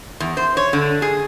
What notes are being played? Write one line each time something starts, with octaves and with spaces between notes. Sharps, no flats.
E2
C5
C#5
D3
G#4